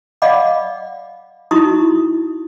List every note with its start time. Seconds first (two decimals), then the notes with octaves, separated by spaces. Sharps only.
0.22 D5 D#5 F5 F#5 B5 D6
1.51 D#4 E4 F#4 A#5 C#6 D#6